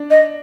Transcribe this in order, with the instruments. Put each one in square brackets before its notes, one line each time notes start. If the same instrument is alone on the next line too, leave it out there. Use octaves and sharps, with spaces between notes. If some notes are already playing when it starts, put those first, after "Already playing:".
Already playing: [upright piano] D4
[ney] D#5